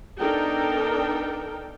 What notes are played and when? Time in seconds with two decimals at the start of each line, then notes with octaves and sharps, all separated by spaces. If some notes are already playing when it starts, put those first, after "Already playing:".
0.20 B3 D4 D#4 A4 A#4 G5